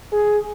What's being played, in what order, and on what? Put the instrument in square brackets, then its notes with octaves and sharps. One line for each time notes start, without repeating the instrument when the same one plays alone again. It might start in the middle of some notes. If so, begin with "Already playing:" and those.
[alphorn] G#4